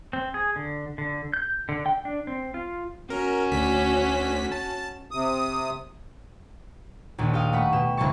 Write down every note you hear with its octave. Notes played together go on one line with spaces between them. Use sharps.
C4
G#4
D3
D3
G6
D3
G5
D4
C4
F4
C#4 F#4 A#4
D2 B6
A5
C3 D#6
A#1 D#2
G4 F5 D#6
A3 F#5 B5 C#6
B2 G4 E7
E1 C2 C#3 G3 A5 C#6